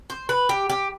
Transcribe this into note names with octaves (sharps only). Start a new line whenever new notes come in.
C5
B4
G4
G4